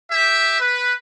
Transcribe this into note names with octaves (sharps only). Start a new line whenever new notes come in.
G4 E5
B4